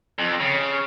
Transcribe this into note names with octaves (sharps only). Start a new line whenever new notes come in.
F2
C#3